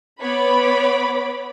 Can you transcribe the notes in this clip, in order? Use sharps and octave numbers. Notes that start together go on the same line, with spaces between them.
B3 C#5 B5 D6